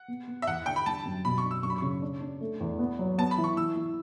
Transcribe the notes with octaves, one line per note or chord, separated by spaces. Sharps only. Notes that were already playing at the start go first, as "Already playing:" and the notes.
Already playing: F#5
B3
B3
E5
E2 F#5
D3 G5
B5
G3 A5
F#2
B2 B5
C#6
D4
E6
F#2 C#6
B5
C#3 C#6
D4
D4
A3
E2
B3
F#3
B3 A5
B5
E3
C#6
E3 E6
E3